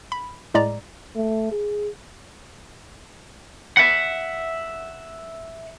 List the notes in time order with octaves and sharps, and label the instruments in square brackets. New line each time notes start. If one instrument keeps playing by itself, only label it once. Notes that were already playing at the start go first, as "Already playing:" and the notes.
[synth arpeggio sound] B5
A2 G#3 D5 A#5
[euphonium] A3
G#4
[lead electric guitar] E5 F#5